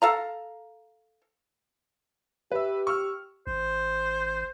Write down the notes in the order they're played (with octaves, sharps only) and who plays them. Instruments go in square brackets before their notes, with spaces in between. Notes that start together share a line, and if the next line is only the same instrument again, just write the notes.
[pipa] A4 F5 A#5
[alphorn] G4 [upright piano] B4 E5
[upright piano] C#6 E6 F6
[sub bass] A1 [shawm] C5